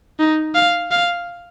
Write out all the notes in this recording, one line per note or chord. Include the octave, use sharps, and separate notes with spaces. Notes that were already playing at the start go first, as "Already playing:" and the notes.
D#4
F5
F5